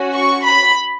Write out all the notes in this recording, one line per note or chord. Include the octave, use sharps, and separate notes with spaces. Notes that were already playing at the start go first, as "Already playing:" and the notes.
Already playing: C#4 F#4
C#6
B5